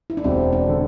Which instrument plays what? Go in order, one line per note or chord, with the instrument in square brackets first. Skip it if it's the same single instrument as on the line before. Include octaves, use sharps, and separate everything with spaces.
[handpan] E4
D4
[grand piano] E1 [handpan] C4
[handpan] D4
[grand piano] D3